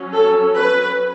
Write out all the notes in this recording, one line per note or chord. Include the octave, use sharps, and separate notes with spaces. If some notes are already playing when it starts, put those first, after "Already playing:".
Already playing: F#3 C#4
A4
B4